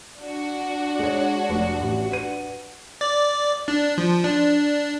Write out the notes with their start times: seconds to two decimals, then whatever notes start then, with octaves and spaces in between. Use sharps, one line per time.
0.19 D4 F#4
0.99 G#3 C#5
1.49 F1
1.81 A1
2.12 B4 D#7
3.01 D5
3.68 D4
3.98 F3
4.24 D4